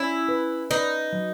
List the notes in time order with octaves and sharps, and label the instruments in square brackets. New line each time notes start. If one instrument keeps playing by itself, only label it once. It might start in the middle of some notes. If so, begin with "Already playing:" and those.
Already playing: [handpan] C#4 [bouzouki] E4
[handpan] B4
[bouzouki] D#4 [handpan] B4
[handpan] F#3